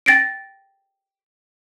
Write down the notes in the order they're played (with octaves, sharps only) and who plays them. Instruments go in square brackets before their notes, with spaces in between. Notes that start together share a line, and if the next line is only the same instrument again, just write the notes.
[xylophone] G5 A6 A#6 C7 D7